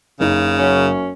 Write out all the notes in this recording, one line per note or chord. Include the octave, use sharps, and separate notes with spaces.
F#1 C#3 D#4
F#2 C#4